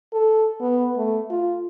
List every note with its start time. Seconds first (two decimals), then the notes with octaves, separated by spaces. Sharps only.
0.13 A4
0.61 B3
0.97 A3
1.30 F4